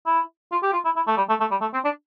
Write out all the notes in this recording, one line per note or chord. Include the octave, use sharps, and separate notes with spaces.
E4
F4
G4
F4
E4
E4
A3
G3
A3
A3
G3
A3
C4
D4